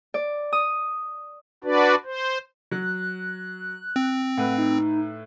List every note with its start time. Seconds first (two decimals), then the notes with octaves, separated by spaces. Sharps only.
0.14 D5
0.53 D#6
1.64 D4 F#4 B4 D5
2.05 C5
2.71 F#3 F#6
3.96 C4
4.37 A2 B4 F#5
4.58 D#4